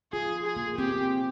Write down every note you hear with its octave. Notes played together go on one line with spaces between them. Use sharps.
F4 G#4
G#4
A#3
C4 G4